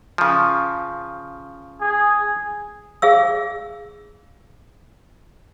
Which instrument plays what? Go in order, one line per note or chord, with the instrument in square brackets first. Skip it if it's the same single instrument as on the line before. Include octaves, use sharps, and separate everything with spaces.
[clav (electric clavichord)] C#3 F3
[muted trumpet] G#4
[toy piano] G#4 F5 E6